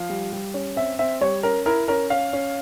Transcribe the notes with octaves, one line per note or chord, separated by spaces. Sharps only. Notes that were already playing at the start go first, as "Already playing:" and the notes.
Already playing: F3 F5
G3
G3
C#4
C4 E5
C4 E5
G3 C#5
C#4 A#4
E4 A#4
C#4 A#4
C#4 F5
C#4